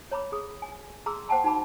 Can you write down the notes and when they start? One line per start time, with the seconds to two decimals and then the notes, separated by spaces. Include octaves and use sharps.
0.11 C#5 A#5 B5 D6
0.32 G#4 D#6
0.62 G#5
1.06 G#4 A#5 C6 D6 E6
1.28 C5 F#5 G5 A5 A#5 C6
1.44 D#4 F#4 A5 B5 D6